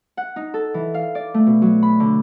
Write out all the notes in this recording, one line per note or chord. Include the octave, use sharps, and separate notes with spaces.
F#5
D#4
A4
E3
F5
D5
A3
B2
F#3
B5
D3